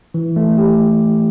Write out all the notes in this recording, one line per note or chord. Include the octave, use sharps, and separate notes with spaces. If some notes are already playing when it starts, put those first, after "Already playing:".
E3
A3
G4